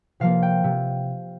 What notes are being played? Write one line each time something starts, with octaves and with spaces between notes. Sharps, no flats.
C3 F3 A#3 F5
G5
C3